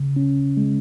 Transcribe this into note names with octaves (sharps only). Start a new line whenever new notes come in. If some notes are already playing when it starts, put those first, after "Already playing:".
Already playing: C#3
C#4
G#3